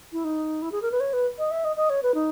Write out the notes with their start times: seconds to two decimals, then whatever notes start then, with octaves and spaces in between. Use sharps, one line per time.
0.13 E4
0.24 D#4
0.62 E4
0.72 G#4
0.82 A#4
0.92 B4
1.00 C#5
1.13 B4
1.39 D#5
1.51 E5
1.64 D#5
1.77 D#5
1.90 C#5
2.03 B4
2.15 D#4